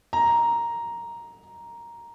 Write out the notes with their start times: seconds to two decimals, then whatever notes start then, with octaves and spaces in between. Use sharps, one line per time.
0.13 A#5